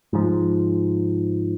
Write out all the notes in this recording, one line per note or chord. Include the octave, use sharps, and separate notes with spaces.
G#2 F3